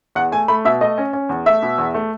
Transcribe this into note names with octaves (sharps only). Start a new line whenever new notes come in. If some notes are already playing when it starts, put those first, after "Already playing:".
E2 F#5
A3 G#5
A3 B5
B2 E5
A3 D#5
C#4
C#4
E2
A3 E5
B2
E2
A3